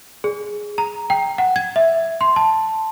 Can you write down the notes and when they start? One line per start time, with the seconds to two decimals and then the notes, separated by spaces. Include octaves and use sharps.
0.24 G#4
0.78 A#5
1.10 G5
1.38 F#5
1.56 G#6
1.76 E5
2.21 C6
2.36 A5